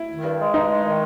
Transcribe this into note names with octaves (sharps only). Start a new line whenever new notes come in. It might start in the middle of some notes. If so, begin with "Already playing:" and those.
Already playing: E4
D#3
G2
G#3
G2 D#4
G#3
D#3